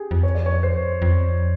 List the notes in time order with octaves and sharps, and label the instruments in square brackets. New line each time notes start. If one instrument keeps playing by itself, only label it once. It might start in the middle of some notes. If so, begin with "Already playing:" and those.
Already playing: [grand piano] G4 G#4
[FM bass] F2
[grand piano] C#5
D5
C#5
C5
[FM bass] F2